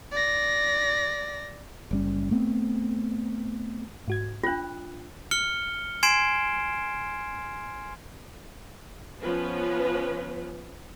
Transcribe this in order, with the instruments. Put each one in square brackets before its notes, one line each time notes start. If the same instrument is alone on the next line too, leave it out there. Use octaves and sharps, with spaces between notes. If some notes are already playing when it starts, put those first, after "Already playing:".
[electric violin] D5 A#6
[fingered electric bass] F#1 G3 C#4
A3 B3 C4
[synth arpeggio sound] G#2 F#4 G#6
[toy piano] D4 F4 [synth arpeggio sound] G5 F#6
[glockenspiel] F6 C#7 G7
G#5 C6 G#6 C7 D7 E7
[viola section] F3 B3 C#4 B4